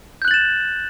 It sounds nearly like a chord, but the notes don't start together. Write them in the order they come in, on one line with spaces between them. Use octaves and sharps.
G6 F#6 F#7 A6 E7